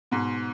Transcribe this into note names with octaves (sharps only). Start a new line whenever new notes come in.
G#2 B2